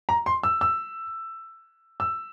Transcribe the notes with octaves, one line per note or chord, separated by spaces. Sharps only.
A#5
C6
E6
E6
E6